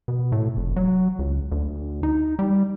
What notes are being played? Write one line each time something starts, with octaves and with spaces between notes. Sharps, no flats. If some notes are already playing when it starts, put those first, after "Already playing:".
B2
A2
F1
F#3
C#2
D2
D#4
G3